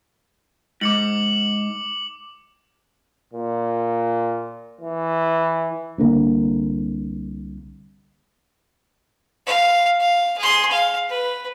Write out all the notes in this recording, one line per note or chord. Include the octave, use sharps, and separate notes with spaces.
G#2 D6 C#7 F#7
A#2
E3
C2 D3 A#3
F5
F5
G#4 C6
F5
B4